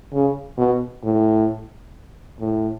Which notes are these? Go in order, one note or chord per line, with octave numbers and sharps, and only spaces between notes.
C#3
B2
A2
A2